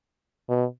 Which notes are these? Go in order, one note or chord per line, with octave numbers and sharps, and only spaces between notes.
B2